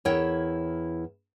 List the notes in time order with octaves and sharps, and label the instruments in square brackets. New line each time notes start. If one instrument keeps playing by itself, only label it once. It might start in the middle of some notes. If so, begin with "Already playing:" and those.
[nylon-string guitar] E2 E4 A#4 C#5 G5